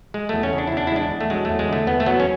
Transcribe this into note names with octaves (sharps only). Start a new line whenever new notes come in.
G#3
E2 A3
C#4
C#3
D4
E4
E2 D4
E4
G#3 D4
E2
A3
F#3 G#3
E2 A3
G#3
D3 A3
E2 B3
A3
F#3 B3
C#4